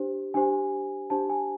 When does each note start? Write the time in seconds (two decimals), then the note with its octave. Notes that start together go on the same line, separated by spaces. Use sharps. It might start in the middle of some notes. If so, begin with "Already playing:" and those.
Already playing: D4 G4 C5
0.34 D4 G4 C5 G#5
1.10 D4 G4 C5 A5
1.30 G#5